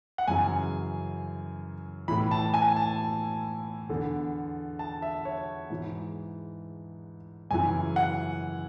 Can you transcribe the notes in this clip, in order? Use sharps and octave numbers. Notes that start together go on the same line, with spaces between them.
F#5
F#2 C#3 E3 G#5
A2 E3 B5
A5
G#5
A5
E2 D3
A5
E5
C#5
G#2 E3
F#2 C#3 E3 G#5
F#5